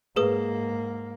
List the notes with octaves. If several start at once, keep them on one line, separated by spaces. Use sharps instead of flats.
G#2 A#3 G#4 B4 D#6